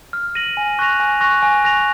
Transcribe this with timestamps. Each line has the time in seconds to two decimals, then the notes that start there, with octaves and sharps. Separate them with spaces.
0.13 F6
0.35 A#6 D#7 F#7
0.57 G#5
0.79 C#6 F#6 A#6 F7
1.00 G#5
1.21 C#6 F#6 A#6 F7
1.43 G#5
1.64 C#6 F#6 A#6 F7